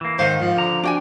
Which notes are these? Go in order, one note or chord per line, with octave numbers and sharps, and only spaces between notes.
E3 A#3
G#2 D#3 D#4 A#4 C5 F5
G#2 F3
D3 A#5
D4 F#4 G5 G#5